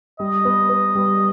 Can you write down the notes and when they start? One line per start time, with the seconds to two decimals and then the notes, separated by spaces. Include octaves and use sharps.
0.20 G3 D#5
0.45 B3
0.69 B3
0.95 G3